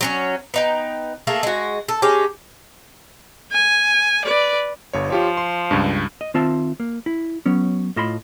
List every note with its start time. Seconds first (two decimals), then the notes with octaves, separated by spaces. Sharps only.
0.01 F#3 C4 C#4
0.54 B3 D#4 G5
1.27 A3 A#3 G#4 A4
1.43 G#3 F#4
1.89 A4
2.02 G#3 C#4 G4
3.52 G#5
4.25 B4 D5
4.93 G1 G2 C#5
5.10 F3 F4 G4 C#5
5.37 C6
5.71 C#2 G2
6.21 D#5
6.34 D#3 C4 F4 E5 A5
6.80 A#3
7.06 E4
7.46 F#3 B3 C#4
7.96 A2 F4 D#5 A5 B5 C6